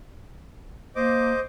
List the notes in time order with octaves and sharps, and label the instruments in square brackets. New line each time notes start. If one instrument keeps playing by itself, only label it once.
[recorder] A#3 [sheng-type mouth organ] C5 D#5 D6